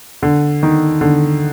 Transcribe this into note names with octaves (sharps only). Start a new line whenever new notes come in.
D3
D#3
D3